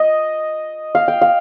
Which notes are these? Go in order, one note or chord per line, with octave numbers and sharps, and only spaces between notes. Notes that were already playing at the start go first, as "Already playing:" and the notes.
Already playing: D#5
F5
G5
F5